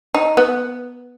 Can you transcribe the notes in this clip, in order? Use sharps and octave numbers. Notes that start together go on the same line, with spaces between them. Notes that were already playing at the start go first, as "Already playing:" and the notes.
D#4
B3